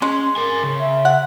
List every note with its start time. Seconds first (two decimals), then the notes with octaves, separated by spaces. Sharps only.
0.02 G#3 C#4 C6
0.36 A#4 G#5
0.63 C#3
0.80 E5
1.05 F#5